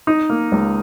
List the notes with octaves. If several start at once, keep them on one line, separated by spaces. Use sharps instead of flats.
D#4
A#3
C#2